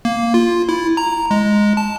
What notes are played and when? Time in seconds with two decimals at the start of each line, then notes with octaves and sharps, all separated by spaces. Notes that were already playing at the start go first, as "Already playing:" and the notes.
0.05 A#3
0.34 F4
0.69 E4
0.97 A#5
1.31 G#3
1.77 A5